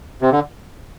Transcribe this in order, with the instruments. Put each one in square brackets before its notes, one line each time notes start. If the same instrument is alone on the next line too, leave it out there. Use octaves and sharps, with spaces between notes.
[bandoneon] C3
D3